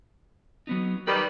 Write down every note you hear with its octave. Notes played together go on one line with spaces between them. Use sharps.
F#3 B3 D#4
D#3 G3 B4